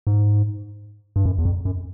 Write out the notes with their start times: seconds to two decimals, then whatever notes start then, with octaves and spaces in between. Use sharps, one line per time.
0.07 G#2
1.16 G2
1.25 F#2
1.39 E2
1.45 F2
1.65 F#2